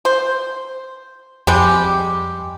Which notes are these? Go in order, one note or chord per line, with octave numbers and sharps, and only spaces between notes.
C5
F2 G3 G#3 G4